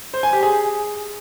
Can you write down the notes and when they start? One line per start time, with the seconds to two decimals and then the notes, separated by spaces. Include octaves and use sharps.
0.14 C5
0.23 G#5
0.33 G4
0.43 G#4